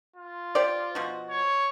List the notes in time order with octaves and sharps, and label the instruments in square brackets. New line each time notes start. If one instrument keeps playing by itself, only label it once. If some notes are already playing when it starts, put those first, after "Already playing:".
[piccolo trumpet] F4
[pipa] G4 C5 D5
B2 F3 F#4
[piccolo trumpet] C#5